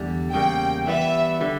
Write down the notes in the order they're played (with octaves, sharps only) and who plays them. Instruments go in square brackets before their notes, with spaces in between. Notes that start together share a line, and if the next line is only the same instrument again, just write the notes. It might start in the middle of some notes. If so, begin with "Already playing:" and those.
Already playing: [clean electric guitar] E2 D3 G3
[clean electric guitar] E2 C#3 G3 A#3 [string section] G5
[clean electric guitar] E3 G3 B3 E4 [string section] E5
[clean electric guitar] D3 G3